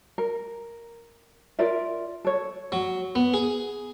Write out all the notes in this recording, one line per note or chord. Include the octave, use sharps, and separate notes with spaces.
A#4
F4 A#4 D5 E5
A4 C#5
F#3
B3
G#4